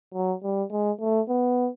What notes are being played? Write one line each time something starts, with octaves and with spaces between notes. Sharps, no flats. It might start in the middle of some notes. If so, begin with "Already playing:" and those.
F#3
G3
G#3
A3
B3